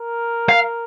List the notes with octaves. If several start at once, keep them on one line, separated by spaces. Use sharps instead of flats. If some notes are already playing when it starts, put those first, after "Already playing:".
Already playing: A#4
F5